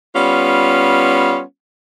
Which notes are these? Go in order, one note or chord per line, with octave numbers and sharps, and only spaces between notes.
G3 B3 C#4 F4